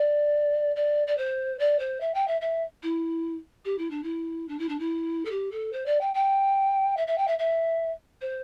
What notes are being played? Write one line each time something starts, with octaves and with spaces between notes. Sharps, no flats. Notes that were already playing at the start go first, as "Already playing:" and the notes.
Already playing: D5
D5
D5
C5
D5
C5
E5
G5
E5
E5
E4
G4
E4
D4
E4
D4
E4
D4
E4
A4
G4
A4
C5
D5
G5
G5
E5
E5
G5
E5
E5
C5